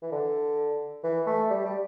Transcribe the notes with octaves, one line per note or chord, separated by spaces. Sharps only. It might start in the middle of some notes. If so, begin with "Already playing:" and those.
E3
D3
E3
A3
G3
G3